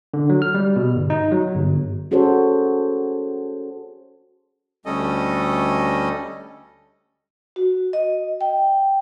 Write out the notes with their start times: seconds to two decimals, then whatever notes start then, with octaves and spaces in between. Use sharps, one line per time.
0.14 D3
0.30 F#3
0.42 F6
0.54 G3
0.76 B2
0.95 G1
1.10 D#4
1.32 F#3
1.54 G1
2.11 C#4 F#4 G#4 A4 C5 C#5
4.86 D2 G3 C#4 A4 D#5
7.56 F#4
7.93 D#5
8.41 G5